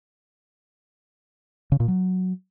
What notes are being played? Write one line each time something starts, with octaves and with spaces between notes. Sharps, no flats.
C#3
A#2
F#3